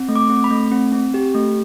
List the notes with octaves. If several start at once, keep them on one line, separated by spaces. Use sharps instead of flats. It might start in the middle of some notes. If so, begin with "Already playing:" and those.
Already playing: C4
A3
D6
C4
B5
A3
C4
C4
G4
A3